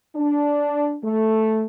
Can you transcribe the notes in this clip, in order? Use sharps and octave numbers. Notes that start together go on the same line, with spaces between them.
D4
A3